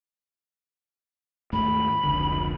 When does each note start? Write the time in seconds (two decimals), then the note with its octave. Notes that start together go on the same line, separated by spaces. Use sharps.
1.53 D#2 G#2 A3 B5
2.04 F1 C#2 D3